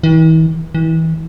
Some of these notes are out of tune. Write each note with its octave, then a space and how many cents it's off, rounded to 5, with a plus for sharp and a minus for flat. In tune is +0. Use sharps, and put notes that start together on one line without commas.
E3 -45
E3 -30